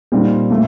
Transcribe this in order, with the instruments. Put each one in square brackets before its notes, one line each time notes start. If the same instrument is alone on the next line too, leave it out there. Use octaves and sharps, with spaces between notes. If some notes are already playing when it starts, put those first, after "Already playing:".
[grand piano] A#2 G3 C4 D#4
A#2 A3